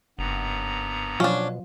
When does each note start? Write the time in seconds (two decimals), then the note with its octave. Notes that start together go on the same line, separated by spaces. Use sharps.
0.19 F#1 G2 B3 A#5
1.20 B2 F3 F#3 C#4 D4 F4